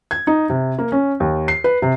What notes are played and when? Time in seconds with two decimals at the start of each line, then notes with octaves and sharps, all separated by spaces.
0.11 G#6
0.27 D#4
0.50 C3
0.79 A#3
0.92 C#4
1.20 D#2
1.48 C7
1.64 B4
1.82 C3